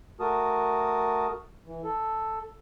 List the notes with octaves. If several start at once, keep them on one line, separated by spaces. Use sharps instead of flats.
A3 F#4 A#4 A5 D#6
E3
A4